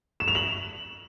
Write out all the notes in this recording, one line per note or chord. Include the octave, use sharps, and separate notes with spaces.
E7
F7
F#7